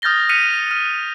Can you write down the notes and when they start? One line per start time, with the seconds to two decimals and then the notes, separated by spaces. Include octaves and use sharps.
0.02 D#6 F6 G6 A6 A#6 G7
0.29 F6 F#6 B6 C#7 D#7 F7
0.71 F6